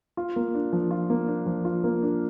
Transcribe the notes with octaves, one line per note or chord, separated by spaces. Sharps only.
F4
A#3
D4
F3
F4
A#3
D4
F3
F4
A#3
D4